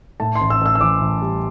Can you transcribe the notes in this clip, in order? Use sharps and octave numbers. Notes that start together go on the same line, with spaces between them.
A2 A5
C6
A1
E6
A1 E6
E6
E3 D6
A1
G3